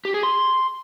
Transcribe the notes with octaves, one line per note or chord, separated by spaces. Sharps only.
G4
G#4
C6